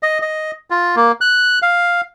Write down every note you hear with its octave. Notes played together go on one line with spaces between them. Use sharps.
D#5
D#5
F4
A#3
F#6
F5